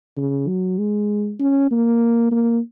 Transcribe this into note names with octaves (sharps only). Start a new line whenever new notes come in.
C#3
F#3
G#3
C#4
A#3
A#3